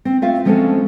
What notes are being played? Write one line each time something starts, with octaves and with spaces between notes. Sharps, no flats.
C4
A3 C4 F4 E5 F5
F3 G#3 C4 C#4 F#4 A4